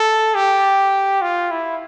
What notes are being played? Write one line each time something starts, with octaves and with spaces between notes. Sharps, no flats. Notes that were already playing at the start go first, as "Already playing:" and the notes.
Already playing: A4
G4
F4
E4